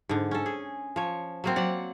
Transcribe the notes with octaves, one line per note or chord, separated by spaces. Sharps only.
G#2 D3
C#4 A4
G#4
F3 C#5
F#3 A#3 C4
F#3 D5 F#5